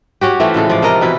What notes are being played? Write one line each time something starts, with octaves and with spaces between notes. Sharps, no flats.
C#4 F#4 G4
E3 A3 C4 F4
A2 C#3 G#3 A4
F3 D5
C3 F4 A#4 D#5
B2 E3 E4